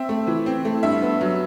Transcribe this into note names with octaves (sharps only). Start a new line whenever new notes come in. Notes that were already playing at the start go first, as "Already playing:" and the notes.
Already playing: C4 E5
A3
E3
C4
A3
G2 E5
B3
F#3